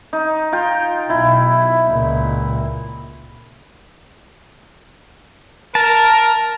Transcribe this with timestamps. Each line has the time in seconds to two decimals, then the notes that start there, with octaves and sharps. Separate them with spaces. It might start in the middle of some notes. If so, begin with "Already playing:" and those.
0.13 D#4
0.52 F4 G5
1.10 B1 E4
1.88 C#2 A#2
5.75 A#4 A5